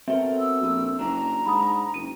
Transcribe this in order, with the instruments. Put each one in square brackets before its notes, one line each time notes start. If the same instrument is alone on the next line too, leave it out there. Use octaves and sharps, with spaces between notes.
[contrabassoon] B2 [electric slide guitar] C4 A4 A#4 [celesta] E5
[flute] E6
[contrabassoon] A#1
[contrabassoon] F#1 [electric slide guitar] D4 [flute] A#5
[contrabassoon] G#2 [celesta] B5 D#6
[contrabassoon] F#1 [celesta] D#7